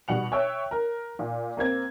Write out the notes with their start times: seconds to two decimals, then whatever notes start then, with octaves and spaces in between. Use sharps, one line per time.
0.08 B2 G3 F#5 F7
0.32 C#5 E5 G5 E6 F#6
0.71 A#4
1.19 A#2
1.57 A#3 C4 G#6